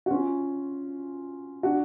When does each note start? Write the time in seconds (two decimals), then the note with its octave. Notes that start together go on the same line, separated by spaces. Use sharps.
0.06 F#4
0.11 C#4 F4
1.63 D4 F#4